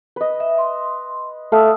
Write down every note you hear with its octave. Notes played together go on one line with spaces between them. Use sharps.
B4 D#5
E5
C6
A3 F5 A5 D#6 E6